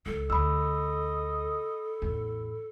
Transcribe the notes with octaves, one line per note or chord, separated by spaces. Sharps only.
C#2 D#3 A4
D2 D#5 B5 E6
A1 E2